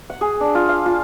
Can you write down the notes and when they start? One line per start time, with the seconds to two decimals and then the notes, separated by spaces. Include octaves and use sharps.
0.10 F#5
0.21 G#4
0.40 D4
0.55 F4
0.69 F5
0.86 F4